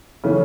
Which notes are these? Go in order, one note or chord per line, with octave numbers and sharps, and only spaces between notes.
C#3 E3 A3 C#4